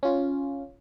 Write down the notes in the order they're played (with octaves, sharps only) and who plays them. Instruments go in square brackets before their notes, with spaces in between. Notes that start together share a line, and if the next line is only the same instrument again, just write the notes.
[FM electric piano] C#4 F4